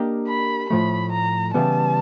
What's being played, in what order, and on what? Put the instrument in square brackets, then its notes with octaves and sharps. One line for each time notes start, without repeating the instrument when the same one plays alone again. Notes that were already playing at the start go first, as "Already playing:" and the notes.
Already playing: [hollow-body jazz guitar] A#3 D4 G4 A#4 D#5
[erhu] B5
[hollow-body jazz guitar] A2 F3 A3 [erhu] B5
[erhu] A#5
[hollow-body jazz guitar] C#3 E3 G3 B3 [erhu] A5